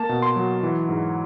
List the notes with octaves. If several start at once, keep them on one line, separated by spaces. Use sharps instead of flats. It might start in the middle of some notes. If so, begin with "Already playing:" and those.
Already playing: A#3 A5
B2
C6
F#3
E3
G#2